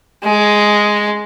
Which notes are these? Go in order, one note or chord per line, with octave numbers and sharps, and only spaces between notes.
G#3